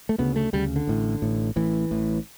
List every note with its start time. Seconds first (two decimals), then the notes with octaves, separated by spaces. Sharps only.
0.09 A3
0.18 D2 C#3 B3
0.36 A3
0.53 D2 C#3 G3
0.76 D3
0.87 A1 A2
1.22 A1 A2
1.56 A1 A2 E3
1.91 A1 A2